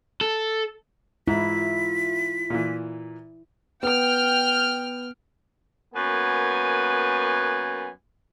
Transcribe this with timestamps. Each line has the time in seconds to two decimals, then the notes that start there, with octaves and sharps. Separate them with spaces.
0.21 A4
1.28 G#2 E4 F4 B6
2.50 A#2 E3
3.83 B3 G5 F6
5.95 F#2 A#3 B3 B4 G#5